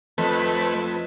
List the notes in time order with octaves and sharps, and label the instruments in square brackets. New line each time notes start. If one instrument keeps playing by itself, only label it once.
[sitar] F2 [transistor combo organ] A3 B4